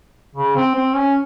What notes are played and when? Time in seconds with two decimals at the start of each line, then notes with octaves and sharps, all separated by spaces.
0.35 C#3
0.56 C4
0.76 C4
0.95 C#4